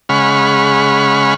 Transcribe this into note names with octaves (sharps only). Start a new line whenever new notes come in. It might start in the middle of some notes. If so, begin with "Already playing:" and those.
C#3 G#3 F#5 B5 C#6 F6